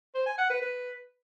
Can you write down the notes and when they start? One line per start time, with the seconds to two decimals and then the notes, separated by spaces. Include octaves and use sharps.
0.14 C5
0.26 G#5
0.38 F#5
0.50 B4
0.62 B4